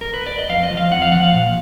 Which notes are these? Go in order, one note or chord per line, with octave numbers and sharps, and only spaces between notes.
A#4
B4
D5
D#5
F2 F5
D#5
F3
F5
F2 F#5
F5
F3 F#5
F5
A#2